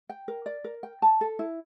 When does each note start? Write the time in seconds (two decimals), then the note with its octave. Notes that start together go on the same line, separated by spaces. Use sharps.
0.09 G5
0.28 A#4
0.46 D5
0.64 A#4
0.83 G5
1.02 A5
1.21 A4
1.39 E4